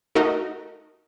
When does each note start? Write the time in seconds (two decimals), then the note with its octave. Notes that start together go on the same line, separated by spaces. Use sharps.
0.15 A3 D#4 F#4 A#4 D#5